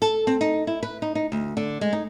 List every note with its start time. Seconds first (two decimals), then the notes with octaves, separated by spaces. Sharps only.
0.02 A4
0.27 C4
0.41 D#4
0.67 E4
0.83 B4
1.02 D#4
1.15 D#4
1.32 D2
1.57 D3
1.81 G#3
1.93 D#4